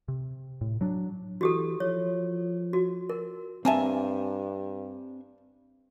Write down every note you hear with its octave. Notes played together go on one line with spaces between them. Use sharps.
C3
A2
F#3 D4
E3 F#4 G4 A4
F3 C#5
F#4
A#4
G2 A#3 C4 E5 G#5 A5